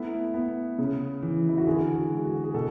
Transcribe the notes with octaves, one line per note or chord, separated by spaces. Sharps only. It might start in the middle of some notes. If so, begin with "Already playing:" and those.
Already playing: A3 B3 E4
B3
C#3
E3
E4
F#4
D3 G#4
F#4
G#3
F#4
G#4
B2 A4